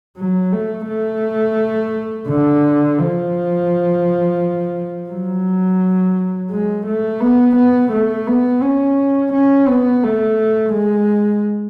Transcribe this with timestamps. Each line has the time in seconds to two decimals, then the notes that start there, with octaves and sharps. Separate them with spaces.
0.18 F#3
0.52 A3
0.88 A3
2.28 D3
2.99 F3
5.10 F#3
6.50 G#3
6.86 A3
7.21 B3
7.56 B3
7.92 A3
8.27 B3
8.62 C#4
9.33 C#4
9.68 B3
10.03 A3
10.73 G#3